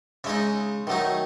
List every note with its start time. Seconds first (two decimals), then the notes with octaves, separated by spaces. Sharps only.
0.24 C#3 G#3 D#4 E5
0.87 D#3 F#3 A3 D#4